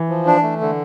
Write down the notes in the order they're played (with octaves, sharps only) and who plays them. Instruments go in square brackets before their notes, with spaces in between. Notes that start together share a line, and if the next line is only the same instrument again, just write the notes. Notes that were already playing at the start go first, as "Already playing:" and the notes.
Already playing: [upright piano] E3
[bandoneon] F3
D4
A3
D3